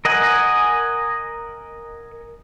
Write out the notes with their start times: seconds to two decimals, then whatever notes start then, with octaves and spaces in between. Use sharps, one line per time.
0.05 A#4 D#5 F#5 G#5